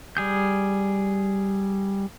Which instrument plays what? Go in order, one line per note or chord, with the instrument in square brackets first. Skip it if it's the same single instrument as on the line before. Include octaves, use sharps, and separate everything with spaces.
[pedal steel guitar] G3 G#4 G6